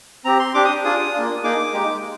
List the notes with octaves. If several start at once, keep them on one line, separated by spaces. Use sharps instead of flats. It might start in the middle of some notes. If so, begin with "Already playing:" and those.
C4 G4 A#5
C6
D4 G4 D6
D#6
D4 F4 G#4 D#6
A#3 D4 F4
A#3 D#4 G#4 D6
G#3 D#4 G4